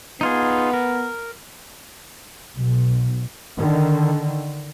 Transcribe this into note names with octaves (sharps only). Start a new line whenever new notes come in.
B3 D#4 F4 G#4
A#4
B1
D3 D#3